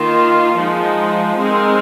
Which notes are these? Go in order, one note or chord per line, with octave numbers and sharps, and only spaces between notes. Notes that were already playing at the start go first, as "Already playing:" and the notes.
Already playing: D#3 A#3 F4
F3 G#3 D#4
G#3 C4 D#4 A#4